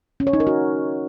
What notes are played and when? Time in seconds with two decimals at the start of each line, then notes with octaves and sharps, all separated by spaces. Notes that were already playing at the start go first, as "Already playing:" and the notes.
0.20 C#4
0.27 C#5
0.33 D#4
0.40 A#4
0.47 F#4